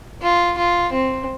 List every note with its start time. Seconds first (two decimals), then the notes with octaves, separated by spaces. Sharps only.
0.22 F4
0.58 F4
0.92 C4